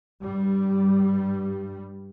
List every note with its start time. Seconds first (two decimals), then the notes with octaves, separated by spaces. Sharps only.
0.22 G2 G3